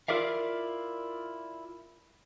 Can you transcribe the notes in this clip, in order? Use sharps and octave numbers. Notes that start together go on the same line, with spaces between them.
E4 F4 A#4 D5 E5 F5